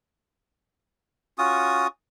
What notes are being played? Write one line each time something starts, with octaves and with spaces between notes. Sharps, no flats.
C#4 F4 F#4 D#6